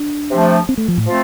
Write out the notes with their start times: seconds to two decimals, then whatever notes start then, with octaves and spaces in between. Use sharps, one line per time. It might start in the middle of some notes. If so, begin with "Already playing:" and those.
Already playing: D4
0.30 C3 F3 A3
0.69 C4
0.78 A3
0.88 F3
0.98 A2
1.07 F3 A3 C4 F4